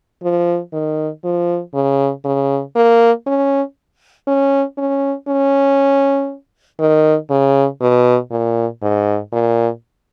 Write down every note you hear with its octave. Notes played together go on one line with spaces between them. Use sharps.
F3
D#3
F3
C#3
C#3
A#3
C#4
C#4
C#4
C#4
D#3
C#3
B2
A#2
G#2
A#2